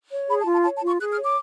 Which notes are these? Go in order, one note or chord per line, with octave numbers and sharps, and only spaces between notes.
C#5
G#4 B5
A5
F4
A5
C#5 A5
A5
F4
C#6
G#4 F#6
F6
C#5
D6